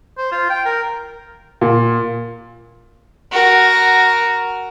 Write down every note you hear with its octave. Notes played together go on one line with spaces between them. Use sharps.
C5
F4
G5
A#4
A#2
F#4 A#4